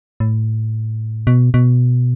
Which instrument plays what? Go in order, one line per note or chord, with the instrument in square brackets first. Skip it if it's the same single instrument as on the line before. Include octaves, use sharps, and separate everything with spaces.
[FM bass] A2
B2
B2